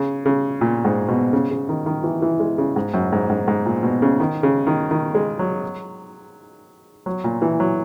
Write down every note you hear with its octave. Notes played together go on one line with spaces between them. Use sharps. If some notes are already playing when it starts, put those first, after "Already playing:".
Already playing: C#3
C#3
A#2
G#2
B2
C#3
C#3
D#3
D#3
E3
E3
G#3
C#3
G#2
F#2
G#2
G#2
G#2
A#2
B2
C#3
D#3
C#3
D#3
D#3
G#3
F#3
F#3
A#2
E3
F#3